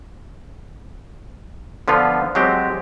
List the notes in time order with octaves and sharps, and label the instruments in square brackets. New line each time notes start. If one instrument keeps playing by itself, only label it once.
[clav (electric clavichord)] D3 F3 B3 F4
F#3 G#3 C4 G4